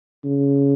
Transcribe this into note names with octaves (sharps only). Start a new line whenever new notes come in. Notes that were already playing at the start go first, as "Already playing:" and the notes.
C#3